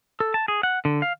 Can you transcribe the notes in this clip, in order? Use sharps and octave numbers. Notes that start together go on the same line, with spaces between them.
A4
A5
G#4
F#5
D3
F5